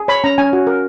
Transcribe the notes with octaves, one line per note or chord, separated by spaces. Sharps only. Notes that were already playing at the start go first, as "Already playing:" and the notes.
Already playing: G#4
C#5 B5
C#4 A#5
C#4 G#5
F#4
A#4